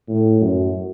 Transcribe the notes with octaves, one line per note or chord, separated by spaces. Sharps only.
A2
F#2